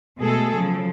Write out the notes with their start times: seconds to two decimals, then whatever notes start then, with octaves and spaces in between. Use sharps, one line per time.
0.18 B2 G#3 A3 G#4 A4
0.53 C#3 F3 F#3